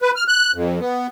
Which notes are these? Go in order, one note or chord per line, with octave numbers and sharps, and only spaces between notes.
B4
F6
F#6
F2
B3